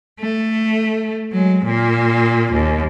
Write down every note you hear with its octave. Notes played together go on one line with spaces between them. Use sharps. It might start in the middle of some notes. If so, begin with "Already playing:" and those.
A3
F#3 G#3
A#2 A#3
D#2